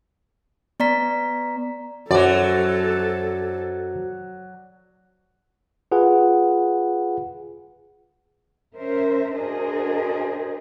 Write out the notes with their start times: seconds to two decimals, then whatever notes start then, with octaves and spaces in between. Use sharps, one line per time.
0.80 B3 D5 A#5 B6
2.11 F#2 F#3 F#4 A4 C5 D5
5.92 F4 G#4 B4 F#5
8.76 C#4 A#4 C5 E5
9.35 D4 F#4 G#4 A#4 C5 D#5